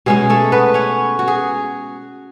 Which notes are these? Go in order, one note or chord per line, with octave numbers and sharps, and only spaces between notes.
B2 G#3 C#4 G#4
A3 A4
B3 B4
C#4 C#5
F#4
G#4